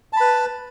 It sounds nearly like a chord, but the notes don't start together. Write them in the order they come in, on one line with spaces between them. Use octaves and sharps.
A5 B5 B4